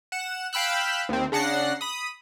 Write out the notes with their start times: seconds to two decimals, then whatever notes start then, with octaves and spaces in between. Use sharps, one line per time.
0.12 F#5 E7
0.53 F5 G5 B5 E6 F#6
1.09 D#2 C4
1.32 C#3 D4 F#5 A#6 C7
1.81 B5 D#6